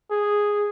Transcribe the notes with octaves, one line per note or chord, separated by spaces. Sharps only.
G#4